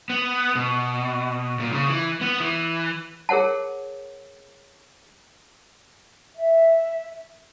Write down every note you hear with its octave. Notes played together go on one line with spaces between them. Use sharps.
B3
B2
A#2
C#3
E3
B3
E3
G#4 A#4 C#5 F#5 A5
E5